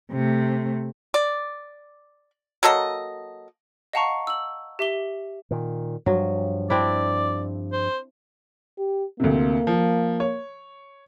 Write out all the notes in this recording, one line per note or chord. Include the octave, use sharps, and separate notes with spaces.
C3 A3
D5
F#3 A#3 A4 D#5
D#5 F5 F#5 A5 A#5 C#6
E6 F#7
G4 E5 D6 G7
A#2 D#3
G2 F3 F#3
C4 D4 E4 D5
C5
G4
D2 C3 A#3
F3
C#5